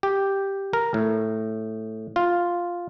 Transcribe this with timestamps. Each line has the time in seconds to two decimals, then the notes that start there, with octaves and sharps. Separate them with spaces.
0.03 G4
0.73 A#4
0.94 A2
2.16 F4